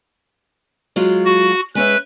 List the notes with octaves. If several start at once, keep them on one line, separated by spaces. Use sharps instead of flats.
F#3 G#3 F4
F#4
G#3 C#4 B4 E5